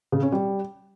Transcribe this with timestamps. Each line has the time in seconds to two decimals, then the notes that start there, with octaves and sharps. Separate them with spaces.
0.12 C#3
0.22 C#4
0.32 G3